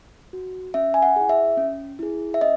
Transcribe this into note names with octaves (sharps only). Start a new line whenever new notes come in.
F#4
C#4 E5
G#5
F#5
E4 G#4
E5
C#4
E4 G#4
E5
C#4 D#5